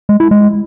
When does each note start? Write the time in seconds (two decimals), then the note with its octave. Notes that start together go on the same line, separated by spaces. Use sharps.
0.09 G#3
0.20 E4
0.31 G#3